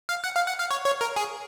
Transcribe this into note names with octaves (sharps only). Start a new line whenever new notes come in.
F5
F#5
F5
F#5
F5
C#5
C#5
A#4
G#4